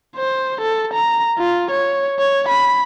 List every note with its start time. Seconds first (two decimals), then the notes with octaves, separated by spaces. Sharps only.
0.16 C5
0.61 A4
0.94 A#5
1.38 F4
1.71 C#5
2.19 C#5
2.49 B5